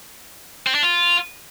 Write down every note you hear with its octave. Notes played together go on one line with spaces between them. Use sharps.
C4
D4
F4